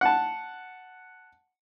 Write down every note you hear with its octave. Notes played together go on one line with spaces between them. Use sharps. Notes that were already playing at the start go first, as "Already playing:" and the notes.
F#5 A5